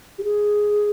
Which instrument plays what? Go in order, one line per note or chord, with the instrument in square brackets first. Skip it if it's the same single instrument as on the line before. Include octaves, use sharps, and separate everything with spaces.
[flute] G4
G#4